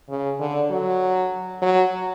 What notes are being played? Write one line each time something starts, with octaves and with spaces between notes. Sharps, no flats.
C#3
D3
F#3
F#3